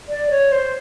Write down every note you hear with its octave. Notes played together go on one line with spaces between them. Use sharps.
D5
C#5
C5